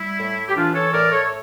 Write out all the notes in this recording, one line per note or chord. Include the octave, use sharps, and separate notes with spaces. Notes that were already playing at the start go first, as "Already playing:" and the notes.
Already playing: G3 E4
A2
G4
E3 D4 F4
A4 C#5
A2 A#4 D5
A4 C#5